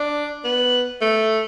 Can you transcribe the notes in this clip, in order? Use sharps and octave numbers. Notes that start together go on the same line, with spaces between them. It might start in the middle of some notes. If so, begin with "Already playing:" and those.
Already playing: D4
B3
A3